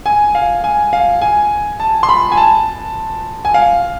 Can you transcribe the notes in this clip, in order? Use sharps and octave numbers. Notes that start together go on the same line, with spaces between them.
G#5
F5
G#5
F5
G#5
A5
C6
B5
G#5
A5
G#5
F5